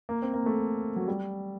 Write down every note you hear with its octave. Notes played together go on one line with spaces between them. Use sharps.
A#3
C4
A#3
A3
F#3
G3